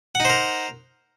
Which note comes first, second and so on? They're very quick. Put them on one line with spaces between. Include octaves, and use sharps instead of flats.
F#5 D#4 C5 A#4